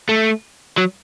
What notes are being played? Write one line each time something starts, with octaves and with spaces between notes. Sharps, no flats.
A3
F#3